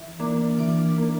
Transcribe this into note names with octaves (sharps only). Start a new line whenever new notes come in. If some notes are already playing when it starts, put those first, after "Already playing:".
Already playing: E3
A#3 D4
E3 D6
A#3 D4